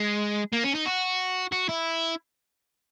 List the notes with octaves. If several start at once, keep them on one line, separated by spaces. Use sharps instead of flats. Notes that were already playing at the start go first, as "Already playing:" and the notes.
Already playing: G#3
A#3
C#4
D#4
F#4
F#4
E4